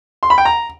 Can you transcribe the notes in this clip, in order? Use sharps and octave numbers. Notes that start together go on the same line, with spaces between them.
C6
B5
G5
A#5